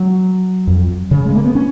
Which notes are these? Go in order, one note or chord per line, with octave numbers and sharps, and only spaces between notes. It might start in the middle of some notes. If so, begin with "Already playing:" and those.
Already playing: F#3
F2
C#3
G#3
A#3
B3
C#4